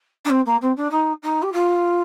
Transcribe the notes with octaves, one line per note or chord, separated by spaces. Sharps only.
D4
C4
A#3
C4
D4
D#4
D#4
G4
F4